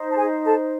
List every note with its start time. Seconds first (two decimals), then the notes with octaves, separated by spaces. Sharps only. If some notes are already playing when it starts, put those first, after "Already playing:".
Already playing: D#4 C5
0.11 A5
0.16 G#4 G#5
0.44 A4 A5